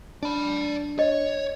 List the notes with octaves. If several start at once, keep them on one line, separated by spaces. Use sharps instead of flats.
D4 D5 B5
C#5 D#5